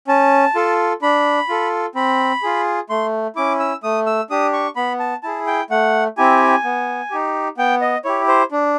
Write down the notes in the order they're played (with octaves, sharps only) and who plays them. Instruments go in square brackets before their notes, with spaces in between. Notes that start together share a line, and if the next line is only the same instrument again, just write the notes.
[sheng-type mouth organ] C#4 A5
F4 A4
D4 B5
F4 A4
C4 B5
F4 G#4
A3 C6
C#4 E4 D6
E6
A3 D#6
E6
D4 G4 D#6
C#6
B3 B5
A5
E4 G#4 A5
G5
A3 F#5
C4 E4 G4 G#5
B3
D#4 G4
B3 G5
D#5
E4 G4 C#5
C5
D4